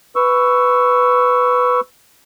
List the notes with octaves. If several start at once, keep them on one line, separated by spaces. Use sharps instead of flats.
B4 C#6 E6